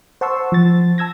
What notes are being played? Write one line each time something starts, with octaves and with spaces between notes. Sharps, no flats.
C5 F#5 A5 C6 C#6 E6
F3 A6
A5 E6 G#6 A#6